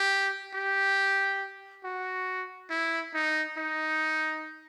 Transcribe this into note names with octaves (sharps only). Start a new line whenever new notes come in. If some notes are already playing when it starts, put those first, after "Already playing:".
Already playing: G4
G4
F#4
E4
D#4
D#4